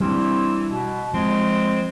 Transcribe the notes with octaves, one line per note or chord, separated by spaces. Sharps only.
E3 G3 C4 D4
B2
F3 G#3 C4